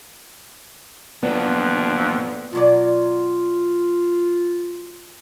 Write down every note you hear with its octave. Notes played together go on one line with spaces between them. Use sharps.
F2 A#2 F#3 B3 D4
B2 F#3 F4 D5